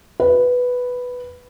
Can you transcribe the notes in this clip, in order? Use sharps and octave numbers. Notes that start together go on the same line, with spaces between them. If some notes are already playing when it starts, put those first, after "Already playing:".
B4